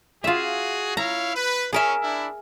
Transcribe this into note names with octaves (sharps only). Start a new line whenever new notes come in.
F4 F#4 G#4 E5
E4 C#5 F5 A#5
B4
C#4 G#4 A#4 E5
D4 E4